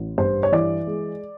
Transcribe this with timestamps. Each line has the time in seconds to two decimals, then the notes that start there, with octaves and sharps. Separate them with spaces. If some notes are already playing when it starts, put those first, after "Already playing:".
Already playing: A1
0.18 G2 C5
0.43 C#5
0.52 E3 D5
0.87 G#3